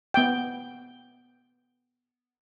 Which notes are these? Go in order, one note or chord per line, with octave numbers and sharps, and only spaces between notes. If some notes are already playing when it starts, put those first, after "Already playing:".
B3 G5